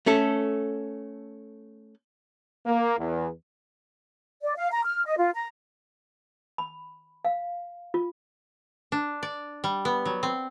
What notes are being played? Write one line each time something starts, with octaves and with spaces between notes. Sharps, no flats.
A3 C#4 A4
A#3
E2
D5
F5
A#5
F6
D#5
F4
A#5
B5
F5
F4
D4
D5
G3
B3
F#3
C4